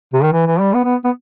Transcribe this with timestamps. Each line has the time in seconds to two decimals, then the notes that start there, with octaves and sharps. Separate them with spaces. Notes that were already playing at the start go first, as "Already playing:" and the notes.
0.14 C3
0.23 D#3
0.33 E3
0.47 E3
0.60 G3
0.74 B3
0.84 B3
1.04 B3